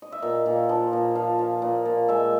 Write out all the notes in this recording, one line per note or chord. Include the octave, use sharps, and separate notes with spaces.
D#5
E5
A#2 F5
A#2
F3
A#2
F3 F5
F3
A#2
A#2
G#3 E5